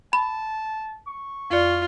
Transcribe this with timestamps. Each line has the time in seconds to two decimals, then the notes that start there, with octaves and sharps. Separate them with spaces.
0.13 A5 B5
1.07 C#6
1.50 F2 F4 D5